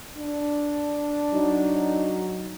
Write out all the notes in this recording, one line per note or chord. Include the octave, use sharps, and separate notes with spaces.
D4
F#3 D#4